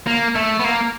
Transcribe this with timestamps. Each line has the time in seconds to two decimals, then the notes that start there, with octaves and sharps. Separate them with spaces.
0.07 A#3
0.35 A3
0.60 B3
0.64 A#3